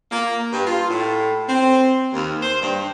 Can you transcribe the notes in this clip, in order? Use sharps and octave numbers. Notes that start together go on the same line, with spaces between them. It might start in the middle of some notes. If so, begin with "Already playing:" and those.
A#3
G2
F4
A2
C4
D#2
C5
G2